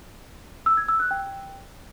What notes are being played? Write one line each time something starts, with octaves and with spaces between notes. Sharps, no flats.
E6
G#6
E6
F#6
G5